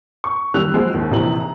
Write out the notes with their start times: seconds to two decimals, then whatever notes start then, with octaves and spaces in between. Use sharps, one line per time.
0.24 C#6
0.54 D#3 G3 E6 F#6 F7
0.74 F3 G#3 F#4 G#4 C5
0.94 D#2 D#4
1.11 A#1 C3 E3 D#4 F#7
1.40 A#5